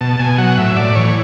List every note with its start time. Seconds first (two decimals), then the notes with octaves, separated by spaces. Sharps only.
0.01 B2 A5
0.20 B2 G#5
0.38 F#3 F#5
0.58 A2 E5
0.76 A2 D5
0.95 E3 C#5